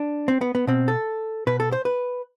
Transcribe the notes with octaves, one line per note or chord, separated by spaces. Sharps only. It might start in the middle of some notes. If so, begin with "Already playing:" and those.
Already playing: D4
C4
B3
B3
B2 C4
A4
B2 B4
A4
C5
B4